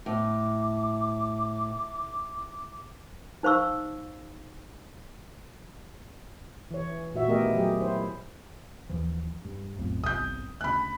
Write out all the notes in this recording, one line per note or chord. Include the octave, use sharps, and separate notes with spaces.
A2 D6
D#4 C5 F5 C#6 E6
E3 C#5
A#2 F#4 E5
D#3 A3 B3 G4 A#4 D#5
F#3 G4 G#4
E4 C5
D#2 E3 F3
G2
B1 F2 A2
G1 C2 D#6 G6
D2 C#3 B5 F#6